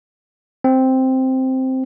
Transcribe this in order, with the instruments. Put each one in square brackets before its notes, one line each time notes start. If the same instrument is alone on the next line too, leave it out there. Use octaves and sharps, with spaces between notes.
[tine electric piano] C4